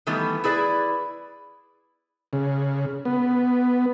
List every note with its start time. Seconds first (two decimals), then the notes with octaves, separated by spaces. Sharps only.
0.07 D#3 E3 G3 A3 B3
0.44 E4 G#4 B4 D5
2.33 C#3
3.05 B3